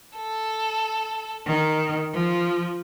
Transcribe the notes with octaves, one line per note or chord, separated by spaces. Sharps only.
A4
D#3
F3